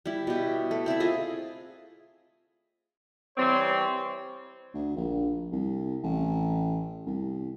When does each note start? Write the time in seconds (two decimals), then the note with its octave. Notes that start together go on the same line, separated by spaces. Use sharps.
0.06 G3 E4
0.27 B2 G4
0.71 A3
0.86 C4 E4 D5 E5
1.00 F4 G#4 D#5
3.37 E3 G3 C4 C#5 C6
4.74 D2
4.96 A#1
5.52 C2
6.03 A1
7.06 C2